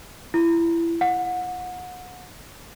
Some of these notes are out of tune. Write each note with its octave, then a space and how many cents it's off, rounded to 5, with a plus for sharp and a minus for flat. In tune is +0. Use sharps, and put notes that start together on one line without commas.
E4 +25
F#5 -30